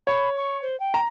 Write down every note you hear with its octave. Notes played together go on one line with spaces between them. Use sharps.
C#5 B5
C#6
C5
G5
A#5